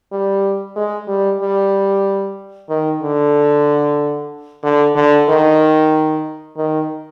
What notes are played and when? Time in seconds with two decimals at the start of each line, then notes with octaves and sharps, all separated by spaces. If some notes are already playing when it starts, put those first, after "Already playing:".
0.12 G3
0.76 G#3
1.08 G3
1.41 G3
2.69 D#3
3.02 D3
4.63 D3
4.96 D3
5.29 D#3
6.57 D#3